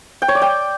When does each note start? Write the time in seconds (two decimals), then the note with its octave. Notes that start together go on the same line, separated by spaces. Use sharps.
0.22 G5
0.28 C#5
0.35 D5
0.42 G5